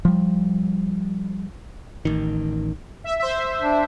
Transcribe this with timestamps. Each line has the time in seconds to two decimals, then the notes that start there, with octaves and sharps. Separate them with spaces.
0.05 F3 G3
2.05 A1 D#3
3.04 E5
3.19 C5 E5
3.62 D4